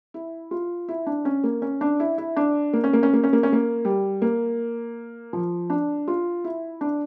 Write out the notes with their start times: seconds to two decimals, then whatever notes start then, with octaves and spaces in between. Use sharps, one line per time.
0.14 E4
0.51 F4
0.88 E4
1.07 D4
1.25 C#4
1.44 A#3
1.62 C#4
1.81 D4
2.00 E4
2.18 E4
2.37 D4
2.73 A#3
2.84 C#4
2.93 A#3
3.03 C#4
3.13 A#3
3.24 C#4
3.33 A#3
3.43 C#4
3.53 A#3
3.85 G3
4.22 A#3
5.33 F3
5.70 D4
6.08 F4
6.44 E4
6.81 D4